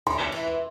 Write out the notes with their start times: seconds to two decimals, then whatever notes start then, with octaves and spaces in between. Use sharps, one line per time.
0.07 D3 C6
0.32 E3